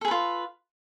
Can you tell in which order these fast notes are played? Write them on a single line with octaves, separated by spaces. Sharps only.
A4 G#4 B4 F4